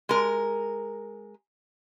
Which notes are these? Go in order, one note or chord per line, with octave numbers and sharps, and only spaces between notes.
G#3 A#4